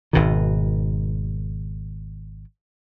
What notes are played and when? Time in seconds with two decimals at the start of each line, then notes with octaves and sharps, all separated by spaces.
0.13 G#1 B2 D#3